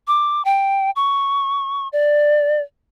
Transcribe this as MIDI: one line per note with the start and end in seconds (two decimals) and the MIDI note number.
0.07 0.42 86
0.45 0.91 79
0.96 1.88 85
1.93 2.61 74